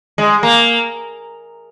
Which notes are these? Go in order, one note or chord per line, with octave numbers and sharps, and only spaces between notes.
G#3
A#3